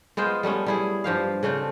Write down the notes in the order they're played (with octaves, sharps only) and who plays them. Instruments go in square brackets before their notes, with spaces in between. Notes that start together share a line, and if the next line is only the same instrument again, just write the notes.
[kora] G#3 B3 F4 C5
G3 A3 B3 C#4
G3 E4 G#4
G2 F3 G4 F5
C#3 A3 C4 D4